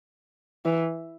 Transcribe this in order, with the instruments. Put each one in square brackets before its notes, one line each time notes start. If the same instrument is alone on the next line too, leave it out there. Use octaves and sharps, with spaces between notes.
[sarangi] E3